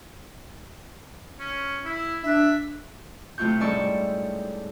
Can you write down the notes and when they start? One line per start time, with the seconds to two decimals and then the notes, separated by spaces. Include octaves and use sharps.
1.40 C#4
1.85 E4
2.24 D4 E5
3.38 C3 A3 E4 F4 C#6 G6
3.60 G#2 G3 C#4 A4 D5 C#6